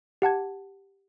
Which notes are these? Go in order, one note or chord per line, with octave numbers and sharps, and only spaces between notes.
G4 F#5 A5 G#6